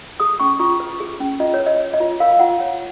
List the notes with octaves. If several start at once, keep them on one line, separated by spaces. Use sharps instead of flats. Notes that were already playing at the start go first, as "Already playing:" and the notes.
G#4 D#6
C#4 C#6
F4 C#6
B4
G#4
C#4
F4 D#5
C#5
B4
D#5
C#5
D#5
F4
A#4 F5
F4 F#5
C#5